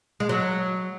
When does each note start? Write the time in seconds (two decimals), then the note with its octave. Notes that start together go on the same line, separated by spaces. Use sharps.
0.20 G#3
0.29 F#3